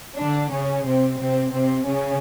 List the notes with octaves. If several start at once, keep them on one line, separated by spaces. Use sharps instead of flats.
D3 D4
C#3 C#4
C3 C4
C3 C4
C3 C4
C#3 C#4